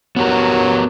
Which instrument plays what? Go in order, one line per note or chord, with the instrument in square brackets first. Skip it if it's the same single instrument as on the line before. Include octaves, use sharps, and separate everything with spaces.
[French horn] F#3 [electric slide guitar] B3 G4 A#4